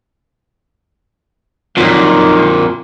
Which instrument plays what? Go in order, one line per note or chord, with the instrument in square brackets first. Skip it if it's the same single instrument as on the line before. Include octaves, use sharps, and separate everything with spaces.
[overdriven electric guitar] F2 A#2 [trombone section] D#3 F#3 D#4